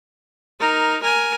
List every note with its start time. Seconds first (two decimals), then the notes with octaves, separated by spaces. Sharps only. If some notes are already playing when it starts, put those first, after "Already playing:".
0.60 D#4 A#4
1.02 A#4 G#5